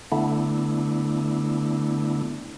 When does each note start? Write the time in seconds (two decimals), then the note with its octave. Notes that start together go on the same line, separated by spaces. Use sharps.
0.12 D3 A3 B3 D4 E4